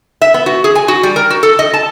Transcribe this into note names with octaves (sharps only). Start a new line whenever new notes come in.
E5
B3
F#4
G#4
G#5
F#4
G3
A#4
F#4
A4
D#5
A5